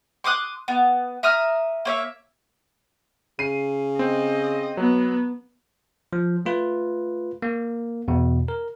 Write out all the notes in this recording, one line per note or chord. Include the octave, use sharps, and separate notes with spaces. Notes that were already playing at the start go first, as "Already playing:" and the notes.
C6 D6 D#6 F#6
B3
E5 A#5 D#6 F6
A#3 C#5 E5
C#3 C7 D#7
C4 D#5
F#3 B3
F3
A3 F4 B4
A#3
E2 B2
A#4